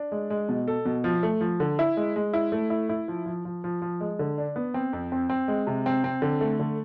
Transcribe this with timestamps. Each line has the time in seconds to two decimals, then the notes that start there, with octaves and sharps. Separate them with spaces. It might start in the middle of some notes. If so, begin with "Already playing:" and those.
Already playing: D4
0.12 G#3
0.30 G#3
0.49 B2
0.68 A4
0.85 B2
1.04 F3
1.23 A3
1.41 F3
1.60 D3
1.79 E4
1.97 G#3
2.16 G#3
2.33 E4
2.52 A3
2.70 E4
2.89 E4
3.08 F3
3.26 F3
3.45 F3
3.64 F3
3.82 F3
4.01 G#3
4.19 D3
4.38 D4
4.56 B3
4.74 C4
4.93 F2
5.12 C4
5.30 C4
5.48 G#3
5.67 C3
5.86 C4
6.04 C4
6.22 D3
6.41 A3
6.59 D3